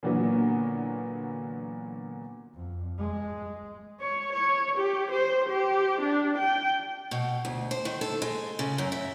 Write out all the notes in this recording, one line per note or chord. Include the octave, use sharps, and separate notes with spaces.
A#2 D3 E3 F#3 A#3 B3
F2
G#3
C#5
C#5
G4
C5
G4
D4
G5
B2
D2
C5
D#3
A4
G#3
C#3
F#2
E5